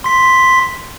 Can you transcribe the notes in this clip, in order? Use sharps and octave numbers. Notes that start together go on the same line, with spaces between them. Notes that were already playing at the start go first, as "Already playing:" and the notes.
C6 B6